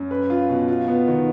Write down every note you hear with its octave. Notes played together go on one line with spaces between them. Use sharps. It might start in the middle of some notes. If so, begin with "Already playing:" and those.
Already playing: F#2
B4
F4
B2
F4
B3
D#3